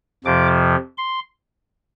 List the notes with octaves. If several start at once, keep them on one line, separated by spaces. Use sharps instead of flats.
F2 C3 F3 D6
C6